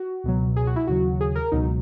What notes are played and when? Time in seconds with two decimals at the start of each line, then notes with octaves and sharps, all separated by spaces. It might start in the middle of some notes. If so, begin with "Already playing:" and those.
Already playing: F#4
0.24 C#2 B2 F#3
0.56 G#4
0.67 F#4
0.76 E4
0.87 D#2 C#3 F#3 F#4
1.21 G#4
1.35 A#4
1.52 C#2 B2 F#3 D#4